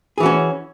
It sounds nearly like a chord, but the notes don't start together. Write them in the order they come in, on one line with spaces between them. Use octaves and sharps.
G#4 E3 F#4 C#4